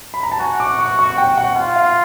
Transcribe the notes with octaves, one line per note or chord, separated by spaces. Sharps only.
B5
A#5
A5
F#4 G#5
D6
C#6
C#6
G5
F#5
F4 F#5
F5